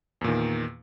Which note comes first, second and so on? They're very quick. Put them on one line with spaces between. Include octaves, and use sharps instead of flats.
E2 A#2 D#3